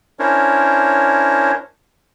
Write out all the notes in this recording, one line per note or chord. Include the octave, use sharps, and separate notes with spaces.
C#4 D4 E4 A#4 C5 C#5